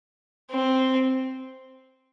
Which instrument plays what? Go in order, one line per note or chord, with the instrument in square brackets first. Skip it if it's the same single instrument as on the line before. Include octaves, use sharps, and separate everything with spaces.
[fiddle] C4